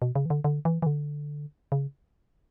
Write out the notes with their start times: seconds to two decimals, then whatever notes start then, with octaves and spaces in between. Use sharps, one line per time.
0.02 B2
0.15 C#3
0.26 E3
0.30 D3
0.44 D3
0.65 E3
0.82 E3
0.86 D3
1.72 C#3